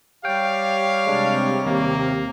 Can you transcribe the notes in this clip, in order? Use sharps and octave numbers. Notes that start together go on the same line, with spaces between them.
G3 G4 C#5 F5 G5
C3 G#3 D4
D#2 A#3